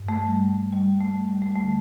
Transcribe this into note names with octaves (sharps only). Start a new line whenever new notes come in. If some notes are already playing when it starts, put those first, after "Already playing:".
Already playing: G2
A3
G3
G3
A3
G3
G3
A3
G3
D2 D3 A3